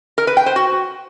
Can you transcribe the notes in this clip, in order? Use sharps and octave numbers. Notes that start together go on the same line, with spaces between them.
A#4
B4
G5
C5
F#4